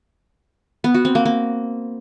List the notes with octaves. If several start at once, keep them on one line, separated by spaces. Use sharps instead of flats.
B3
F#4
C4
A#3
A#3